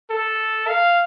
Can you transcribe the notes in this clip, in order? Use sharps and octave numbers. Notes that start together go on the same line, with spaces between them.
A4
F5